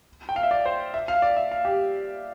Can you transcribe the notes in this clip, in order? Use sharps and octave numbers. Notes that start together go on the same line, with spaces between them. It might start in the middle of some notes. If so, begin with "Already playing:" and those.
G5
F5
E5
D5
C5
E5
F5
D5
E5
F5
G4